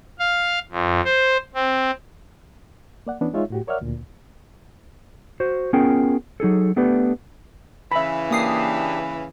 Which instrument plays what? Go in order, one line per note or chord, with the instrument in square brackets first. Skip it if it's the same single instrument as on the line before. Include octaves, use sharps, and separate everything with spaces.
[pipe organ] F5
F2
C5
C4
[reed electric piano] A#3 D5 F#5
E3 B3 C#4 D4
G#3 D#4 F4 C#5 E5
A2 F#4 G4
A#4 C#5 D5 E5 F#5 F6
D2 A#2
[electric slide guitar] F#4 C5
B3 C#4 F4 G#4 A#4 G5
F#3 D#4 G#4 A4
A3 B3 D4 G4 B4
[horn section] C#3 E3 [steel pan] E5 B5
[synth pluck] A#3 D#6 C7 [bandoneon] D4 G4